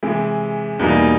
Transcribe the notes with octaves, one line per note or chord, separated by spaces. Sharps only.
C3 E3 G#3
E2 B2 G3 A#3 D#4